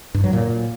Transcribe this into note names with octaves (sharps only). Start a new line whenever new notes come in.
G2
F#3
A#2